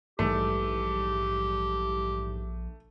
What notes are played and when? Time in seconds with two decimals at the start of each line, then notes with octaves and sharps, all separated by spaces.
0.19 A#1 G#2 E3 G3 A3 G4